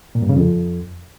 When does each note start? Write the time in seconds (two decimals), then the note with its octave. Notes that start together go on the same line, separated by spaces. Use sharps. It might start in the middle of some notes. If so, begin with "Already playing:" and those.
0.15 A#2
0.22 G2
0.29 C#3
0.36 F2